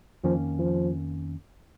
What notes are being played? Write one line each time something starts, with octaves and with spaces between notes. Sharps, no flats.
F2 D#3 F3 A#3 C#4
F3